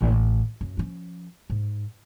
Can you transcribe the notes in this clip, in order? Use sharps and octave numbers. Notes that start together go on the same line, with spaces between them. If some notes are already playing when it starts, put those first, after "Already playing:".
A1
F#2
F3 C#4
G#2